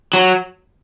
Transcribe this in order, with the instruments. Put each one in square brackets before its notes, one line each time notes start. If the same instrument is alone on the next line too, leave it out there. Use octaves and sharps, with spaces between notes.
[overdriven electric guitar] F#3